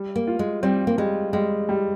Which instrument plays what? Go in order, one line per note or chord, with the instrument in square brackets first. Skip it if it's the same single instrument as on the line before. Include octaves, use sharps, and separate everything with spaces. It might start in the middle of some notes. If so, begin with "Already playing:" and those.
Already playing: [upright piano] G3
[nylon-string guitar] A#3
[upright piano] F4
[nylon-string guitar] G#3
[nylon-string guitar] G3 [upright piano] C4
[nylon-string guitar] A#3
[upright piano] G3 [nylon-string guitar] G#3
[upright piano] G3 [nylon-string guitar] G#3
[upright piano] G3